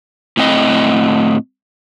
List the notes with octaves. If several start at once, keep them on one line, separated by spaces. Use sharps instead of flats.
A2 C4 D#5